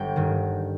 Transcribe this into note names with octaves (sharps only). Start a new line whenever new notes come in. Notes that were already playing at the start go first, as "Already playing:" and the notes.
Already playing: G1 G5
G2 D#3